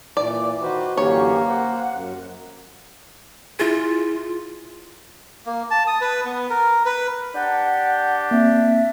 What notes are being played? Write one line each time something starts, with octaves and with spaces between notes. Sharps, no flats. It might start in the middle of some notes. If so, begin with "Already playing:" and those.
A#2 E3 D5 D6
D#3 F#4 B4 C5
F#2 D3 E3 A#3 G4 C#5
C5 F#5
F#2
E4 F4 G#4
A#3
A5
D#6
B4
B3
A#4
B4
D4 G4 F#5
A#3 C4 E5